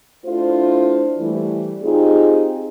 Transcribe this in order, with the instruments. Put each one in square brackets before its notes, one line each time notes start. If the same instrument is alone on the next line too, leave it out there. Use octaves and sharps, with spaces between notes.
[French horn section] A3 D4 E4 F4 C5
E3 G3 A3 E4
C4 D#4 F4 G4 G#4